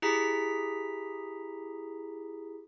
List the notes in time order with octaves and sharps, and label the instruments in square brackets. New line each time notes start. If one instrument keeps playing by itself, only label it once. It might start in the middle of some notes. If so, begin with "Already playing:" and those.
[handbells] E4 G4 G#4 A#5 B6